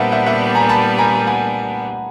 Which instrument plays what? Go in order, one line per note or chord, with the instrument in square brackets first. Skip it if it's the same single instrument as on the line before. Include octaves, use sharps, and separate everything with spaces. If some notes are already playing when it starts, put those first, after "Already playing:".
Already playing: [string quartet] A#2 G3 B3 D4 [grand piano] A#4 C5 E5 F#5
[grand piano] E5 F#5
E5 F#5
G#5 A#5
A5 B5
G#5 A#5
F#5 G#5